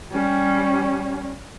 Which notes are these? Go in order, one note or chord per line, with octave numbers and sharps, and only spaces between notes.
G3 C#4